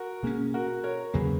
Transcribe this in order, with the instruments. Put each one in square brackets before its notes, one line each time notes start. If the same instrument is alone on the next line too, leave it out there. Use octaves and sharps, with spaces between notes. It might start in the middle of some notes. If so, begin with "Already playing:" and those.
Already playing: [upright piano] F#4 A#4
[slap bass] B2 A#3 C#4 [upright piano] G#4
[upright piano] F#4 A#4
A#4 C#5
[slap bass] E2 C#3 F#3 A#3 [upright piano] G#4 B4